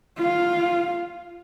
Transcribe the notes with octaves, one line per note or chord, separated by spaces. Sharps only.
F4 F5